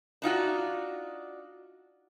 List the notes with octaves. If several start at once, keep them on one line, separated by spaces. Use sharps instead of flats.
D4 D#4 F4 F#4